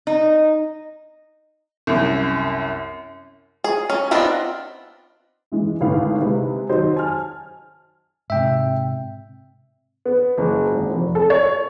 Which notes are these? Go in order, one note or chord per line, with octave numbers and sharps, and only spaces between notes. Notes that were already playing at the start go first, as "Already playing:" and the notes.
D#4
C2 F#2
G#4
C#4
B3 C4 D4 D#4 F4
E3 G#3 E4
G#1 A2 D3 A4 B4 F5
C3 G#3 B4
D#3 F#3 C5 D#5
G#5 A5 F6
G#2 C3 E5 G5
B3
F#1
G#1
F1
A4
C#5